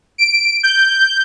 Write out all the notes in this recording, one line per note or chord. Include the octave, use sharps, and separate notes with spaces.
D7
G6